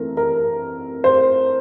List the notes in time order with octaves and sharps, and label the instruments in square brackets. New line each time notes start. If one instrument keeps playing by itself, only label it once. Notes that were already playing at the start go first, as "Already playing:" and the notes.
Already playing: [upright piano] E3 A3 C4 A#4
A#4
C5